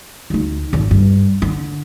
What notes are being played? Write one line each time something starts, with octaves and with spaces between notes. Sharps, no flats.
D2 D#4
G#1 F2
G2
D3